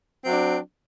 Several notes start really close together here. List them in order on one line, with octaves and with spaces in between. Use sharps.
C4 F#3 D4